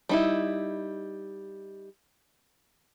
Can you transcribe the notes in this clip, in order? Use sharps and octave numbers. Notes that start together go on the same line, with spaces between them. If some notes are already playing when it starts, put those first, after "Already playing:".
G3 D#4 E4